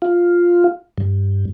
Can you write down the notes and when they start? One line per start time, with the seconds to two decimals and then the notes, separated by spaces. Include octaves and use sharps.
0.02 F4
0.98 G2